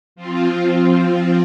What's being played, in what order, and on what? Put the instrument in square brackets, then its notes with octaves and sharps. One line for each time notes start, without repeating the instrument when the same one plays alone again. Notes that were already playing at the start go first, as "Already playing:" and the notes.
[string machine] F3 C4 F4